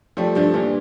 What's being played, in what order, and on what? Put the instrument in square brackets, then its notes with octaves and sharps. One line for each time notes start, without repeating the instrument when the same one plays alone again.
[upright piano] F3 A3 [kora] G3
[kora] G2 [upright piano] F3 A3
[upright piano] A#2 [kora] E3